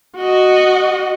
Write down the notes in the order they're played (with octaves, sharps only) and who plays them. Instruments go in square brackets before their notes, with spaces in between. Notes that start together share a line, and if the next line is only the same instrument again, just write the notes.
[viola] F#4 D#5